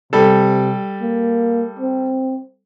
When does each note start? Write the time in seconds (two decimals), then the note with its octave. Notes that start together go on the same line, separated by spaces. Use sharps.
0.13 C3 G3 A4
1.01 A#3
1.79 C4